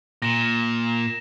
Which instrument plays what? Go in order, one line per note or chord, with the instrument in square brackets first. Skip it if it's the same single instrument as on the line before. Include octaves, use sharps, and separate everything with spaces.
[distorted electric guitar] A#2 [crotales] A#6 E7